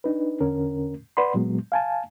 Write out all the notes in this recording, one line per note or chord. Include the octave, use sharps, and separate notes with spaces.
D4 D#4 B4
E2 D3 C#4 A#4
B4 D5 F#5 B5 C6
A#2 F#3 G#3 B3
F5 G#5 A5